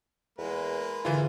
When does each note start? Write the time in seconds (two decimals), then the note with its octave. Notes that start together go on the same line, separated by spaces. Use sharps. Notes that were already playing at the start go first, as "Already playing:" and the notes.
0.38 E2 G#3 A#3 B4
1.05 G#2 D3 E3 E4 F4